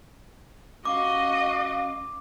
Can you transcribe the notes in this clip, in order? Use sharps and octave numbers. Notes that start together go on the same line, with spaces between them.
C#4 F#4 D#5 F5 D6